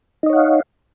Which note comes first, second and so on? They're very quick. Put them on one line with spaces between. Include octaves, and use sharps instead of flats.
D#4 D#5 C#5 F#5 F5